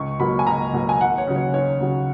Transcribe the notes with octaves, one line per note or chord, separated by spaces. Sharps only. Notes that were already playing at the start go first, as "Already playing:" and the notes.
Already playing: C#2 C#6
B2 F#3 A#3 B5
G#5
C#2 A#5
B2 F#3 A#3
G#5
D#2 F#5
C#5
C#3 F#3
C#5
D#2 C#5
C#3 F#3